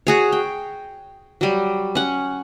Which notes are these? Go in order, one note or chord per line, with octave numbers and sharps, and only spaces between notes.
F#4 G#4 C#5
G5
F#3 G3
C#4 F#5